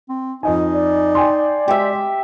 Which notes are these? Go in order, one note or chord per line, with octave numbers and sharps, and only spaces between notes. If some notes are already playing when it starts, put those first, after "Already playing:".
C4
F2 D#4 D#5 G#5
D5
G5 G#5 C6
G#3 G4 E5